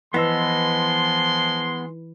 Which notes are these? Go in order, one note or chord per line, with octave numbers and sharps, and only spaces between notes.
E3 F3 G#3 B3 D#5 C6 E6